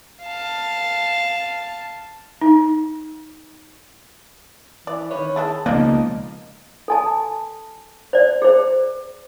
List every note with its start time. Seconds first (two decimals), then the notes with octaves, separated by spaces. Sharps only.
0.23 F5 A5
2.41 D#4
4.87 E3 D5
5.11 D#3 B4 C#5
5.36 D#3 E4 G#4 A4 A6
5.66 C#2 B2 F3 A#3 D#4 F4 B4 D5
6.88 A4 G#5 A5
8.13 C5 D5
8.42 G#4 C5